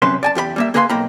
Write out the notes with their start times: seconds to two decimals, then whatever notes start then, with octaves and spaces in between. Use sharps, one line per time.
0.02 C2 F#2 C3 C#4 B4 C6
0.23 D5 G#5 A5
0.35 E2 G4 A#4 B5
0.56 G3 A#3 E5
0.74 A#3 G#4 B4 F5 B5 C6
0.89 B1 A#3 G5 A#5 B5